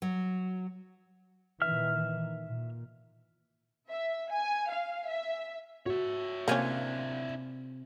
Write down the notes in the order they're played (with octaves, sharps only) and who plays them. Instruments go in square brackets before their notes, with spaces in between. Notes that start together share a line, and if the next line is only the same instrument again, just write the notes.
[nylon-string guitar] F#3
[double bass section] A#2 D#3 E3 [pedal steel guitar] E5 F6
[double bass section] A#2
[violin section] E5
G#5
F5
E5
[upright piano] F#4 [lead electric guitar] C#5 E5
[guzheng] C3 F4 G#5 [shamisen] A#3 C#4 [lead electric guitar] D4 E4